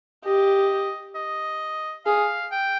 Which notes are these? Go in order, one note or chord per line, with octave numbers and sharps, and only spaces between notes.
G4 D#5
D#5
G#4 F5
G5